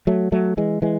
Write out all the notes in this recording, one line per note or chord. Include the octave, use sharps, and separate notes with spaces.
F#3 A3
F#3 A3
E3 G#3
E3 G#3